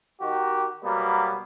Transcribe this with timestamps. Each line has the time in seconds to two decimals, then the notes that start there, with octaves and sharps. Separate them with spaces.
0.21 D#3 D#4 F#4 G4
0.84 B2 F#3 G3 A#3 B3